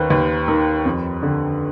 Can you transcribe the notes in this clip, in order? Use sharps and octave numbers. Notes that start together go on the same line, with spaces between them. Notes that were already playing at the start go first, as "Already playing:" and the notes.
Already playing: D#2 D#3 B4 C5
D#2 B4
D#3
F2
D3